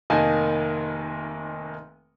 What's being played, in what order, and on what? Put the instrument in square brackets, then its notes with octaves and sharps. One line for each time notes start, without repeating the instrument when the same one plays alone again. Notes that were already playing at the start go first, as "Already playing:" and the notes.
[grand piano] F1 D#3 A#3 D#4 G#5 A5